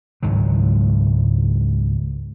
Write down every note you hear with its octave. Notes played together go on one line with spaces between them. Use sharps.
C#2 G#2 D#3 F#3